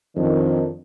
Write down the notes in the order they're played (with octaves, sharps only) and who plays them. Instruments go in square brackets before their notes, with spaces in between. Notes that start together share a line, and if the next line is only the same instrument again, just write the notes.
[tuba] F2 [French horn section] D#3 D4